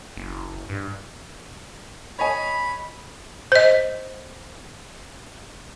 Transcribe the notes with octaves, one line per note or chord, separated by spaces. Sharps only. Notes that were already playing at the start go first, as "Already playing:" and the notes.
F#1
G2
C#5 D#5 G#5 B5
C5 D#5